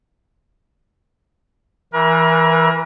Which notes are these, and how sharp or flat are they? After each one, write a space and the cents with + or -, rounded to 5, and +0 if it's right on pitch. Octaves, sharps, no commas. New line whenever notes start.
E3 +0 A#4 +35